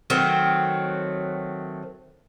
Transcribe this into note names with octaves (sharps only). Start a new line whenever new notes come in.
D#3 F#3 A3 C4